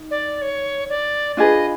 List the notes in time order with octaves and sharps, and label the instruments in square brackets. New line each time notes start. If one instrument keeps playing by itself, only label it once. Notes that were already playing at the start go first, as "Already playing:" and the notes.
Already playing: [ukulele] D#4
[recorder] D5
C#5
D5
[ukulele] D4 F4 G#4 B4 [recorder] D#5